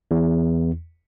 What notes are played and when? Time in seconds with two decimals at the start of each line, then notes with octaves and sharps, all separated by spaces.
0.11 E2